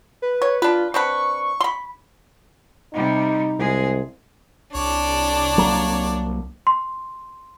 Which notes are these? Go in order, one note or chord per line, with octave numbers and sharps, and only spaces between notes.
B4
C#5
D4 F4 B4
C4 D4 B4 C#6
B5 C6
C3 G3 D#4
C2 G#3 G#4
C2 D4 C#5 D5
F#3 A#3
C6